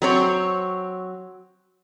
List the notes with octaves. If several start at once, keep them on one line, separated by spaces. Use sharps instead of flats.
F#3 C4 C#5